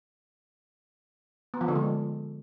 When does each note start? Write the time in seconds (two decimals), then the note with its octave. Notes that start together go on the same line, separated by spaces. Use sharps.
1.54 B3
1.61 F3
1.68 D3
1.75 G#3